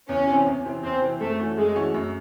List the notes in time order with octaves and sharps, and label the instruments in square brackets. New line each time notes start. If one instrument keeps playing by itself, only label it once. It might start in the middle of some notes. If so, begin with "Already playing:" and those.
[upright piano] E2 [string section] C#4
[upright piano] C3 E3 C4
E2
C3 E3 C4
[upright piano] E2 [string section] C4
[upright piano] C3 E3 C4
[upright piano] F#2 [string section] A3
[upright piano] E3 A3 C#4 F#4
[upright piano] F#2 [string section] G#3
[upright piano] E3 A3 C#4 F#4
F#2